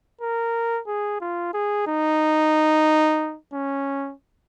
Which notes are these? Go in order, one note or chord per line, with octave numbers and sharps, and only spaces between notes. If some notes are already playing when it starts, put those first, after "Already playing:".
A#4
G#4
F4
G#4
D#4
C#4